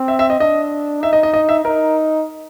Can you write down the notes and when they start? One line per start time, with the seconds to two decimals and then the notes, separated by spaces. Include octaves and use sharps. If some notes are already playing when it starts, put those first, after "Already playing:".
Already playing: C4
0.08 E5
0.19 E5
0.30 D#5
0.40 D4 D#5
1.02 D#4 E5
1.13 D#5
1.23 D#5
1.34 D#5
1.49 E5
1.64 D#4 A#4